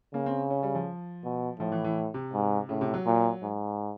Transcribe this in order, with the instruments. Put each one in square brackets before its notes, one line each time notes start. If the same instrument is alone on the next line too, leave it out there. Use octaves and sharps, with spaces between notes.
[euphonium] C#3 [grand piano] A#3
[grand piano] C4
C#4
G3
F3
[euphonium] B2
[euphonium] A2 [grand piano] F3
[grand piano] E3
E3
C3
[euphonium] G#2
[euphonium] A2 [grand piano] C#3
[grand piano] C3
F#3
[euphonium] A#2
G#2